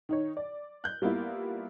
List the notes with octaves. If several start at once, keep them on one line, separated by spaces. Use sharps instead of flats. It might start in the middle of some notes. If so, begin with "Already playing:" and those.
D#3 D#4 C#5
D5
F#6 G6
G3 A#3 B3 E4 F4